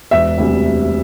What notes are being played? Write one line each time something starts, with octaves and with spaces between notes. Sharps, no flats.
E1 E5
D2 C3 G3